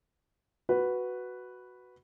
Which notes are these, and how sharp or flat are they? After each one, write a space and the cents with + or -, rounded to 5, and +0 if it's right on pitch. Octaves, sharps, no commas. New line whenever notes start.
F#4 +0 B4 +0